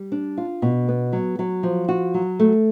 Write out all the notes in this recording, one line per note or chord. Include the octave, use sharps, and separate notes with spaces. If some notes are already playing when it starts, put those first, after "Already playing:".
Already playing: G3
D4
F4
B2
B3
F#3
F#3
F3
F#4
F#3
A3